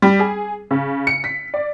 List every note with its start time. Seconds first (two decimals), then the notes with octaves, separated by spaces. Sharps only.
0.02 G3
0.19 G#4
0.71 C#3
1.07 C#7
1.24 B6
1.54 D5